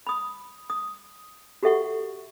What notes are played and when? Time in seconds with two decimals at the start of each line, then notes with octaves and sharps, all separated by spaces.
0.07 B5 D#6
0.70 D#6
1.63 F#4 G4 A4 E5 F#5 C#6